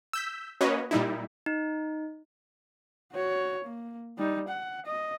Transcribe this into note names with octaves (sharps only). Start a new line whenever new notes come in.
E6 G6 B6
A#3 C#4 F#4 B4 C#5 D#5
A#2 G3 D#4 E4
D#4
F#4 C#5
A#3
G3 D#4
F#5
D#5